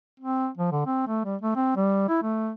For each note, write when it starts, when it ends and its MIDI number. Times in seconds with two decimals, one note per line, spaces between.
0.20 0.48 60
0.58 0.72 53
0.72 0.82 50
0.86 1.06 60
1.08 1.21 57
1.25 1.36 55
1.42 1.55 57
1.56 1.73 60
1.76 2.07 55
2.09 2.20 64
2.22 2.52 57